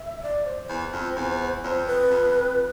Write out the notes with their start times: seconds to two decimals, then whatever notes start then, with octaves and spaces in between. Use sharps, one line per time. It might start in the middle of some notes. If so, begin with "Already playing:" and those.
Already playing: E5
0.22 D5
0.46 C5
0.69 E2
0.93 F2
1.16 E2
1.63 F2 C5 D5
1.87 B4
2.10 F2